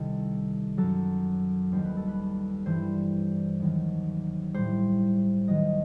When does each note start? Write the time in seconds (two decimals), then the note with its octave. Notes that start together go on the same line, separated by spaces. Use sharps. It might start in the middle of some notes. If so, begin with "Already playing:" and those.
Already playing: C2 C3 D#3 G3 A4
0.77 F#2 F#3 A4
1.72 D#2 D#3 G3 C5
1.84 B4
1.97 A4
2.08 B4
2.66 G2 E3 G3 C5
3.60 D#2 D#3 F#3
4.54 A2 G3 C5
5.48 D#2 D#3 F#3 D#5